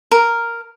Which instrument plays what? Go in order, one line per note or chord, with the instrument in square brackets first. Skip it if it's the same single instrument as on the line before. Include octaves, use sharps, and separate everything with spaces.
[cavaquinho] A#4